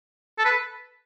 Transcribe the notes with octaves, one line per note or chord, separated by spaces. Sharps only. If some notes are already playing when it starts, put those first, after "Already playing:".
A4
B4